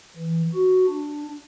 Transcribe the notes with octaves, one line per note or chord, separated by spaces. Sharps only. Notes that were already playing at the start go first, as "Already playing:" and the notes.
E3
F#4
D4